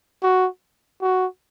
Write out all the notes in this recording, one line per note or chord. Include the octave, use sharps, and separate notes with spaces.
F#4
F#4